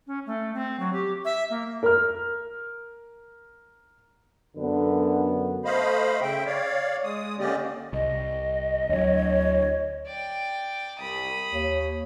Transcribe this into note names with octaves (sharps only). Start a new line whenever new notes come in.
C#4
A3
C4
F#3
G4
E5
A#3
A#4 F6
F#2 D3 B3
A3 C5 D#5 F5 B5
C#3 E5 G5
C#5 D5 F5
G#3 D#6
D3 A#3 C#4 G4 D5 D#5
C2 D#5
D2 F#3 C#5
D5 G5
C2 B5 D#6
D#2 C#5